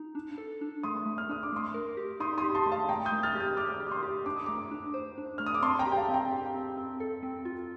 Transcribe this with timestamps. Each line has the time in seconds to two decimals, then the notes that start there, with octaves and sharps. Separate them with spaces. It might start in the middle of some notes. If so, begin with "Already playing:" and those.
Already playing: D#4
0.15 D4
0.38 A4
0.61 D4
0.83 A3 C6 D#6
1.06 A3
1.18 F6
1.29 D4 D#6
1.43 D6
1.52 A3 C6 D#6
1.74 A#4
1.97 G4
2.20 D#4 C6 D#6
2.38 C6 D#6
2.44 G4
2.55 A5 C6
2.66 A3
2.72 F5 A5
2.89 A3 G5 A#5
3.05 D#6 G6
3.12 A3
3.23 F6 A6
3.35 G4
3.40 D#6 G6
3.57 A3 D6 F6
3.80 G4
3.87 D6
3.91 C6 D#6
4.03 G4
4.26 D4 D6
4.36 D#6
4.46 A3 A#5 D6
4.71 D4
4.94 C5
5.18 D4
5.38 A3 F6
5.46 D#6
5.54 D6
5.62 C4 A5 C6
5.79 G5 A#5
5.86 G4
5.92 G5
5.97 F5 A5
6.09 C4
6.14 G5 A#5
6.31 G4
6.55 C4
6.77 C4
7.00 A4
7.23 C4
7.45 F4